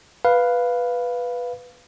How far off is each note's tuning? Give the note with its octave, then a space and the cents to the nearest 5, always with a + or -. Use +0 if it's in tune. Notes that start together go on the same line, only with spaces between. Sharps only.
B4 +0 F5 +0